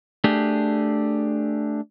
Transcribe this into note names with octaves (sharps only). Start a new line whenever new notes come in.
A3 D4 G4 G#4